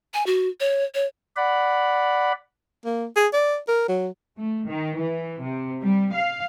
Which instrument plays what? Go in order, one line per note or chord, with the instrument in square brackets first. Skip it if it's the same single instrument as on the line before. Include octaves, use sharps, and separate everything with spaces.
[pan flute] G#5
F#4
C#5
C#5
[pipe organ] D5 F#5 B5
[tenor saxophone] A#3
G#4
D5
A#4
F#3
[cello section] A3
D#3
E3
C3
G3
F5